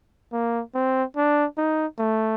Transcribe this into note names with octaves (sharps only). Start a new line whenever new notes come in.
A#3
C4
D4
D#4
A3